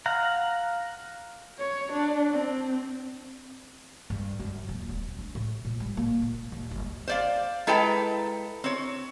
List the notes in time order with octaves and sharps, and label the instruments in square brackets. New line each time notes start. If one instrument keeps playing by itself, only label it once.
[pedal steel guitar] F5 F#5 A#5
[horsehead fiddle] C#5
D4
C4
[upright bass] G2
F#2
D#1
C4
D4
A2
A#2
G3
A#3
A#2
D#2
G1
[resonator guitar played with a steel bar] C5 D5 F5
G#3 E4 A4 B4 G5 A#5
C4 C#5